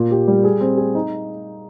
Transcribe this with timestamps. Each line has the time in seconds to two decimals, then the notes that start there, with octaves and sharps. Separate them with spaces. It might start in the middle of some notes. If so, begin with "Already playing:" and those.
Already playing: A#2
0.11 G4
0.28 G3
0.44 G#4
0.61 C4
0.77 G#4
0.95 D#4